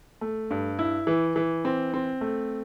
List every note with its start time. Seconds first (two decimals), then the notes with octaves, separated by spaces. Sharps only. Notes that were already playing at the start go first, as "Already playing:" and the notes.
0.21 A3
0.51 G2
0.79 E4
1.07 E3
1.36 E3
1.65 C4
1.94 C4
2.21 A3